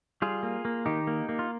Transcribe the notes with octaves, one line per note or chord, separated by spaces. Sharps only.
G3 F4 G#4
A#3
A#3
D#3 D#4 G4
A#3
A#3
F4